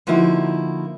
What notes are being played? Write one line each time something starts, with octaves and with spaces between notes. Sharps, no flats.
D3 F3 A#3 D#4 E4 F#4